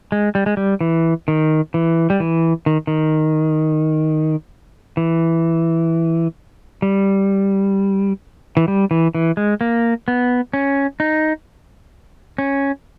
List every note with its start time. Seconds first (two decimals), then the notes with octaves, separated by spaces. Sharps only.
0.12 G#3
0.35 G3
0.46 G#3
0.57 G3
0.81 E3
1.28 D#3
1.74 E3
2.10 G3
2.20 E3
2.66 D#3
2.87 D#3
4.97 E3
6.82 G3
8.57 E3
8.68 G3
8.91 E3
9.15 E3
9.37 G#3
9.61 A#3
10.08 B3
10.53 C#4
11.00 D#4
12.38 C#4